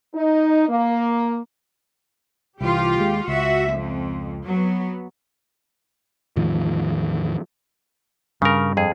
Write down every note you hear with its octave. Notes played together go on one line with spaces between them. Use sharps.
D#4
A#3
C2 E3 F4 G4
D#2 G#3
C#2 F#4 E5
F2
F#3 B3
E2 A2 D#3 F3
G2 C#3 A#4
F2 G#4